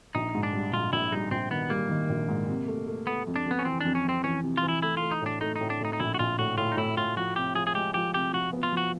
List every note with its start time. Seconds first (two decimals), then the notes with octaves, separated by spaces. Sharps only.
0.15 A#1 D#4
0.35 G#2
0.43 D4
0.53 G3
0.72 A#1 F4
0.93 A#1 E4
1.12 G3 D#4
1.31 A#1 C4
1.50 D#3 B3
1.70 G3 A#3
1.89 D#3
2.09 A#1
2.28 G#2
2.48 C3
2.68 A3
2.87 A3
3.07 A3 B3
3.27 F2
3.36 D4
3.46 F2
3.51 B3
3.59 C#4
3.65 E3 C4
3.81 F2 D4
3.95 C#4
4.05 F2 C4
4.24 E3 C#4
4.43 C3
4.57 F4
4.63 E3
4.68 E4
4.82 A3 E4
4.97 A3 F4
5.11 D#4
5.22 A2 D4
5.41 A3 D#4
5.56 D#4
5.61 A2
5.70 D4
5.81 A2 D#4
5.93 D#4
6.00 A#1 E4
6.14 F#4
6.19 A#1 F4
6.39 A2 F#4
6.57 A2 F4
6.72 D#4
6.77 A2 E4
6.97 A2 F4
7.17 F3 F#4
7.36 C3 G4
7.55 F3 G#4
7.67 G#4
7.74 G#3 G4
7.94 F3 G4
8.14 C3 G4
8.33 F3 F#4
8.53 B3
8.63 F4
8.72 F3 F#4